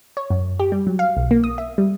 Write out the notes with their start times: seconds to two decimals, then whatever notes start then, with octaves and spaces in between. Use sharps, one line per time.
0.17 C#5
0.30 F#2
0.60 G4
0.72 G3
0.87 F#3
0.99 F5
1.17 B1
1.31 A#3
1.44 D#6
1.58 E5
1.78 G3